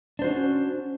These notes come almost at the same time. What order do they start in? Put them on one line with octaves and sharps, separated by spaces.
D4 C5 F#4 C#4